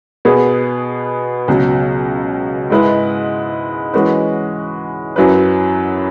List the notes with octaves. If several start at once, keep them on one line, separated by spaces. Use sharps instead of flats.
B2 B3 G#4 B4
C#2 B2 F#3
G#2 G#3 E4 B4
E3 G#3 C#4 F#4 B4
F#2 F#3 E4 B4